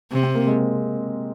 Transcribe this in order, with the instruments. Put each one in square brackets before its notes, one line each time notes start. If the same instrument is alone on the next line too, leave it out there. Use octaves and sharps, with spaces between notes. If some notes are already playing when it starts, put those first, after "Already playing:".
[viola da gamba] C3
[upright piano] C4
A#3
G#3